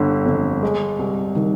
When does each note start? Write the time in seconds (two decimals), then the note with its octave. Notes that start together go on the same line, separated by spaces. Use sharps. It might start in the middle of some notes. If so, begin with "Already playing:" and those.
Already playing: G1 D3 G3
0.26 F2
0.63 G#3
0.99 C2
1.35 D#3 G3